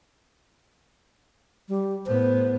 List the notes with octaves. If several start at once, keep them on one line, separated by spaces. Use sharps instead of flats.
G3
A2 B3 C5